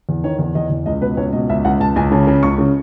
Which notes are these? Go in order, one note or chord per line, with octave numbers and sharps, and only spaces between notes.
E2
D#3 C#5
E2
E2 D#5
E2
C#2 D#5
B2 B4
C#2 C#5
B2 D#5
C#2 E5
C#2 F#5
C#2 A5
C#2 G#5
C#3 A5
C#3
C#2 C#6
C#3